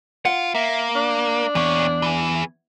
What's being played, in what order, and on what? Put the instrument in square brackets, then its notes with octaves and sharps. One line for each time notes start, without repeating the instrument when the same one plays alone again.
[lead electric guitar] F4 [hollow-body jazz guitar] F#5
[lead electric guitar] A#3 [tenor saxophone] E5
[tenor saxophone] D4
[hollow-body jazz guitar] E2 [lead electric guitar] A#2 C#5
[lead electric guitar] E3 G#4